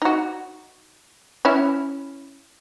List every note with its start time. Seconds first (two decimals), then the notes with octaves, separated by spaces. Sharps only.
0.02 D#4 F#4
1.45 C#4 E4